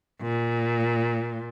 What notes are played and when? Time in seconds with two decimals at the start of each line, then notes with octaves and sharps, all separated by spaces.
0.22 A#2